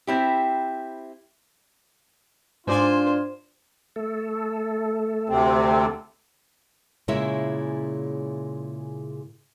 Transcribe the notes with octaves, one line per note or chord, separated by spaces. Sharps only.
C4 E4 G4
G#2 D4 F4 C5 D5 G#5
A3 A4
D2 C3 C4
A#2 C#3 G#3 E4 C#5 E5